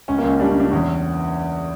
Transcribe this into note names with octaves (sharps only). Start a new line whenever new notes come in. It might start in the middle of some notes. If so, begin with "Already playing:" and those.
C#2 C#4
A#3
C#2 C#4
G3 D4
C#4
C#3 D4
E2 C#4